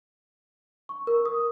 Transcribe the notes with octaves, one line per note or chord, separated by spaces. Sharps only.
C#6
A#4
D#6